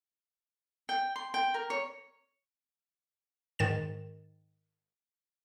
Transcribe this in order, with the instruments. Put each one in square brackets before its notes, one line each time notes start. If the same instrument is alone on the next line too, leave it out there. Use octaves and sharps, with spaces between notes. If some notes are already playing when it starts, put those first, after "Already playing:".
[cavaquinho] G5
C6
G5
A#4
C#5
[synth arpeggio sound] G#2 D#3 A6 E7